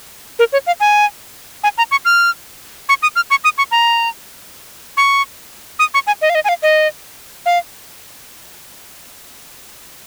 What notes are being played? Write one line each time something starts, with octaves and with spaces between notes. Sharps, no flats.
A#4
C#5
F5
G#5
G#5
A#5
C#6
F6
C#6
D#6
F6
C#6
D#6
C#6
A#5
C#6
D#6
C#6
G#5
D#5
F5
D#5
G#5
F5
D#5
F5